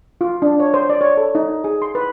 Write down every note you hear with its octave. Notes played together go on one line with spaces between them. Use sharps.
F4
D4
C#5
C5
D5
C#5
A4
D#4
G#4
C6
B4